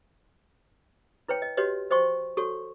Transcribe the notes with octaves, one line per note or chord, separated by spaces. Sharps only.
E4 B4 C#5 G5
D#5
F#4 G4 B4 C#5 D#5
F#4 C5 D#5 G5 C6 C#6
F#4 A4 C#5 C#6